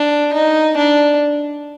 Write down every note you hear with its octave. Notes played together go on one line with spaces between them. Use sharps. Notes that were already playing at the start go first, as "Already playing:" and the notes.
Already playing: D4
D#4
D4